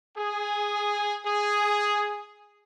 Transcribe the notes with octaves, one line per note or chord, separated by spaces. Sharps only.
G#4
G#4